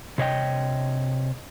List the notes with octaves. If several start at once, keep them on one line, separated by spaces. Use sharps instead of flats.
C3 C#5 D#5 G5